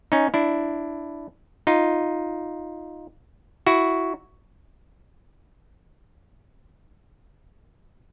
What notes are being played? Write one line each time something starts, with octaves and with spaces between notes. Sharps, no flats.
C#4 D#4
D4 E4
D#4 F4
E4 F#4